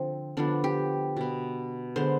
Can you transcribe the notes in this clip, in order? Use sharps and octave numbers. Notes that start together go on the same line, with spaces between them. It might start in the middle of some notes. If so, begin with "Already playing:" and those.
Already playing: D3 F3 C4
D3 F3 B3 D4
G4
B2 B3
D3 G#3 B3 C5